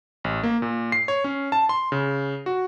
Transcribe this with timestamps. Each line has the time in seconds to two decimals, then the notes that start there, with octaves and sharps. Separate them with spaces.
0.24 A1
0.43 A#3
0.62 A#2
0.92 C7
1.08 C#5
1.24 C#4
1.52 A5
1.69 C6
1.92 C#3
2.46 F#4